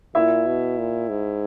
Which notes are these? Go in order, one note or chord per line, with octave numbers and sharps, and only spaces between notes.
A#2 E4 E5
B2
A#2
G#2